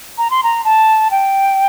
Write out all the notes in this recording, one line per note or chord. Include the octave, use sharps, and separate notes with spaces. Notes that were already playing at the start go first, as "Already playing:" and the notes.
A#5
C6
A#5
A5
G5